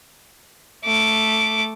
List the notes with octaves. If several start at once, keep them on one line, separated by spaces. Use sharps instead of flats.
A3 D6